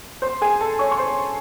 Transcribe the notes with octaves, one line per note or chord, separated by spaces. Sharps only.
C5 C6
G#4 G#5
A4 A5
C#5 C#6
C#6
C5 C6